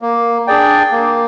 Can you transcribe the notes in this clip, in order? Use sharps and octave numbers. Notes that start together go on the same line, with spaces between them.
A#3
D4 G#4 D5 G5
A#3